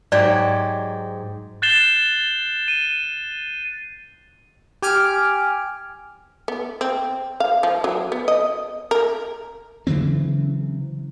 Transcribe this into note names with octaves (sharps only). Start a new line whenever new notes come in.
G#2 F#3 G4 D5
F#6 G6 A6 C7 E7 G7
D#7
G4 G#5 F6 D7
B3
C4
F5
F3
F#3
B3
D#5
A#4
C#3 E3 F#3 C4